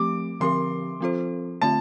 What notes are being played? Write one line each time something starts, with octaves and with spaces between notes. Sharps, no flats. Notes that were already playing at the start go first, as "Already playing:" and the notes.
Already playing: F3 A3 C4 G4 D6
D3 F3 C4 G4 A#4 C6
F3 C4 F4 A4 C5
D3 A3 C4 F4 A5